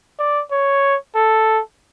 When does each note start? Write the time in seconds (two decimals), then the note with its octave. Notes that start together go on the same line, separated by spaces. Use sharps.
0.19 D5
0.51 C#5
1.16 A4